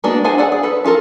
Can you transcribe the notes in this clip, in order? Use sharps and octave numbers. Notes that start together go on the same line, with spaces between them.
G#3 A#3 B3 D4 F#4
D4 G#4 C5 F#5 G#5
A4 D5 F#5
G#4
A4 B4
C#4 F4 A4 A#4